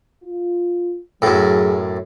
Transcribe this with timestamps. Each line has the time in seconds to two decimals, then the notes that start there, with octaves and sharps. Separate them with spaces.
0.23 F4
1.22 F#2 A2 F#3 G#4